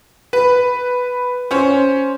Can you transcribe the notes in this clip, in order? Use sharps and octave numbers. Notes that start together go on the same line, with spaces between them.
B4
C#4 C5